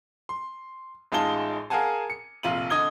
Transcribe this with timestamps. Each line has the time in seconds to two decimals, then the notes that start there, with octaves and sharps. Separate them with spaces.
0.29 C6
1.12 A1 G#3 D#4 F4 A5 G7
1.70 G#4 A#4 F5 F#5 G#5 A5
2.10 C#7
2.43 F1 A#1 F4 F5 D#7 F#7
2.70 D3 D#5 D#6 G#6 G7